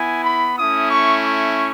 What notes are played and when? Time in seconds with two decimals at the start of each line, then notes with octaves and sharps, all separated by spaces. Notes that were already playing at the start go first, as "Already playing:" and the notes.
Already playing: B3 E4 G#5
0.25 B5
0.58 A3 C#4 E4 D#6
0.91 C#6
1.25 C#6